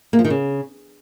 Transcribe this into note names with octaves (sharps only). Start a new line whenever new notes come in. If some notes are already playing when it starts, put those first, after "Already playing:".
A#3
F3
D#3
C#3